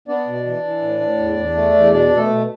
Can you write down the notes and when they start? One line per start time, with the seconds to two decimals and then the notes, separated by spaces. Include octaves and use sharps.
0.08 B3 D4 D5
0.27 B2
0.45 E3
0.63 E3
0.82 A2
1.01 A2
1.19 E2
1.37 E2
1.55 A3
1.74 E2
1.92 B2 D4 D5
2.11 B2
2.17 A3 A4
2.29 B2